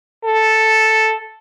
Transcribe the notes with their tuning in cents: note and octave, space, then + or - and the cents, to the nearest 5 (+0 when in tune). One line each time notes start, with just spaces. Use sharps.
A4 +0